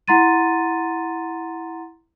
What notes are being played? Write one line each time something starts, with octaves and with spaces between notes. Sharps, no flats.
E4 F#5 A#5 C6 A6 D#7